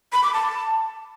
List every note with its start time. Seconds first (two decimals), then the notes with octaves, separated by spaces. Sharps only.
0.13 B5
0.23 D6
0.33 A5